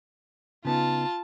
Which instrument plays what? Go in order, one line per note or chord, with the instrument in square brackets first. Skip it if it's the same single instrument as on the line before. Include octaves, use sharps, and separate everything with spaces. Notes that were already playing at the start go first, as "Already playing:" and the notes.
[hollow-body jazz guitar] C#3 B3 D#4 [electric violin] F4 A5